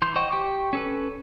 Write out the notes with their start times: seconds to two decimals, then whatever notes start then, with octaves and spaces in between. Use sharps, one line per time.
0.02 E3 C6 G6
0.16 C5 D#5 F#5 G5 C#6
0.30 G4 G5 C#6 D6
0.73 C#4 A4 B4